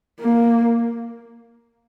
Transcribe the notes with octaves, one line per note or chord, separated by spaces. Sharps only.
A#3